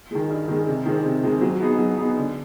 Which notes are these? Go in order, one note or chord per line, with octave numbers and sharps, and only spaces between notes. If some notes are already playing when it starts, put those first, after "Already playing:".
D#3 G#3
G2
D#3 G#3
C3
D#3 G#3 C4
C3
D#3 G#3 C4
F#3
B3 D#4 G#4
F#3
B3 D#4 G#4
D3